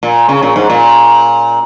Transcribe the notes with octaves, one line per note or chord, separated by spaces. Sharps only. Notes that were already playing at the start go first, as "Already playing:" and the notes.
A#2
C#3
A#2
G#2
A#2